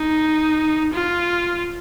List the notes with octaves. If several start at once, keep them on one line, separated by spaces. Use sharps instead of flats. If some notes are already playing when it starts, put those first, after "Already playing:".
Already playing: D#4
F4